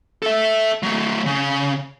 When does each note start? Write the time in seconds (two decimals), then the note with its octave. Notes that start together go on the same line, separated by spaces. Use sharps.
0.22 A4 E5
0.83 F#3 A3
1.26 C#3